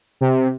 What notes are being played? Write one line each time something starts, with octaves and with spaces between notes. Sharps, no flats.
C3